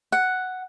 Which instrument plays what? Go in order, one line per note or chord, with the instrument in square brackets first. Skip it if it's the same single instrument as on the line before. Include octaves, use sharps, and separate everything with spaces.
[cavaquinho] F#5